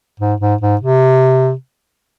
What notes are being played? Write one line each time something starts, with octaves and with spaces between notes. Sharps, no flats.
G#2
G#2
G#2
C3